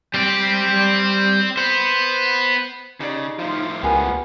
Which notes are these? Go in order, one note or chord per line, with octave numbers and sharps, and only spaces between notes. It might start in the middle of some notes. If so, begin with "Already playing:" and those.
G3 C4 D5
B3 C5
C#3 D#4 G4 D5
A2 F3 F4
C#2 B3 G4 A#4 G#5